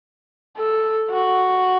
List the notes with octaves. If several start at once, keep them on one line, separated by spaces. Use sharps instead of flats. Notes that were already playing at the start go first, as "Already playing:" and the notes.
A4
F#4